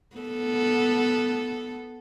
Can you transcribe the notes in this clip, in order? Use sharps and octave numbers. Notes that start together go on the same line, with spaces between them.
B3 A4